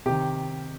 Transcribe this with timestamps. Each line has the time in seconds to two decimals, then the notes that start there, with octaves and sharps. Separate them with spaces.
0.06 C3 D#3 G4